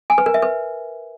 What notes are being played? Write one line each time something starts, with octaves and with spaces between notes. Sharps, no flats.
G#5
B4
A#4
E5
B4